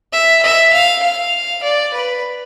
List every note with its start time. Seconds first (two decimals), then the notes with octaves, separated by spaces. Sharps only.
0.13 E5
0.43 E5
0.73 F5
1.03 F5
1.63 D5
1.94 B4